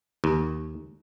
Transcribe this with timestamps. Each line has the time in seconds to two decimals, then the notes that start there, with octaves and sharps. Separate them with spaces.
0.24 D#2